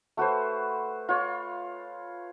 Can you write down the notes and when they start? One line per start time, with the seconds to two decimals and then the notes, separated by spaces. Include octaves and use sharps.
0.17 A3 F#4 B4 C5
1.09 F4 C#5